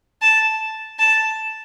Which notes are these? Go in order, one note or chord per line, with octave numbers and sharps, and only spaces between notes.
A5
A5